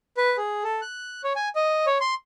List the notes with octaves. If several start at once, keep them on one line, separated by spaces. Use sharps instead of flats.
B4
G#4
A4
F#6
C#5
G#5
D#5
C#5
C6